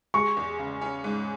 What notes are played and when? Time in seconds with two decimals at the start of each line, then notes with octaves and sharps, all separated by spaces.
0.14 G#3 C#6
0.37 E2
0.59 C#3
0.81 C#4
1.04 G#2